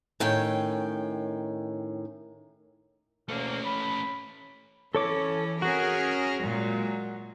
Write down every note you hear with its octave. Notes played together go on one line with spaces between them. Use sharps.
A2 D#3 C#4 G5
D2 B2 A3 A#3 C#4
B5
E3 C#4 A4 C#5 D6
C#4 F#4 G#4 A#4
A#2 F#3 G#3